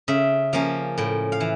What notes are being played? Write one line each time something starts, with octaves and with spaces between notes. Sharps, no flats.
C#3 E5
F3 A#3 C#4 F5
A2 G5
F5
E3